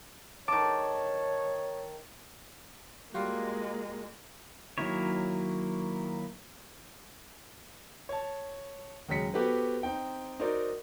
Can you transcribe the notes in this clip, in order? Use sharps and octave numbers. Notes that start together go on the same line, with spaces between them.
D#3 C#5 A5 D6
G3 G#3 A#3 F4 F#4
D#3 F#3 A#3 E4 C#5
C#5 A5
D#2 C#3 F#3 G#3 B6 C#7
B3 F#4 G4 A4 B4 C5
C4 D#4 G5
D#4 F#4 A#4 C5 D5